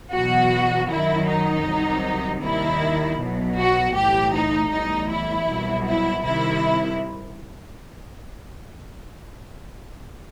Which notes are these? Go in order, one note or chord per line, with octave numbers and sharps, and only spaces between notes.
E2 B2 F#3 F#4
F#2 D#3 F#3 E4
D#4
C2 C3 D#3 F#3
D#2 D#3 G3 E4
B1 B2 F#3
F#4
B1 A2 E3 G4
D#4
B1 A2 E3 G3 D#4
E4
C2 B2 F#3
E4
C2 C3 D#3 E4